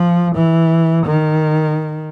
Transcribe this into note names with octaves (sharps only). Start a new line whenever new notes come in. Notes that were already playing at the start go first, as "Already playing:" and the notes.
Already playing: F3
E3
D#3